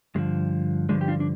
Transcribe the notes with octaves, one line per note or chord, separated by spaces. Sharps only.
G2 D3 F3 G#3
G2 D3 F3 G#3
G4
D4 F4
D4